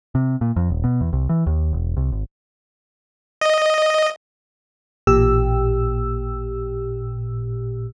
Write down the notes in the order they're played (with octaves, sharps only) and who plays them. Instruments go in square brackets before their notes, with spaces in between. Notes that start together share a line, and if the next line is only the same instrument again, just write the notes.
[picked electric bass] C3
A#2
F2
D#1
B2
E2
C2
E3
D#2
E1
C2
G#1
[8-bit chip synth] D#5
[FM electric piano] A1 A#2 G4 E6